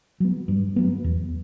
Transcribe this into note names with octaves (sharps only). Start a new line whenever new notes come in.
F#3 B3
G2
F#3 B3
E2